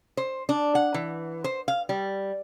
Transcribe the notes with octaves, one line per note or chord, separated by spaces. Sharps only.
C5
D4
F#5
E3
C5
F5
G3